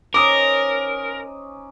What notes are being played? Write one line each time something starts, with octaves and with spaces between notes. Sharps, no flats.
C#4 D#4 A#4 C5 D6 D#6